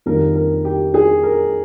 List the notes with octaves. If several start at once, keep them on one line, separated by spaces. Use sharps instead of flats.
F2 D#3 G3 A#3 A#4
A#4
G4
G#4
A#4